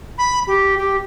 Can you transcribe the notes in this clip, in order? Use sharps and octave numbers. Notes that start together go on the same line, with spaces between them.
B5
G4
G4